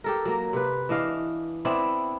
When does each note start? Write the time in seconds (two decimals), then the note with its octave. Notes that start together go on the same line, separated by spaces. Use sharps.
0.04 G4 A4 A#4
0.25 F#3 A#3
0.53 C3 B4
0.89 E3 D4 D#5 F5
1.65 B3 C4 D4 E4